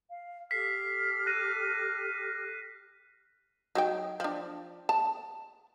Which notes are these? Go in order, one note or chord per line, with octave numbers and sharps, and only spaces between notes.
F5
G4 A4 F6 B6 C7
F#6 A#6 D#7
F#3 D#4 G5
F3 D4
A5